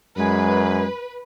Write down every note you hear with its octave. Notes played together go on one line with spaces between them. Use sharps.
F#2 G#3 B4